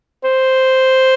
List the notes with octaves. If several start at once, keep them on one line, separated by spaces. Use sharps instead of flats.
C5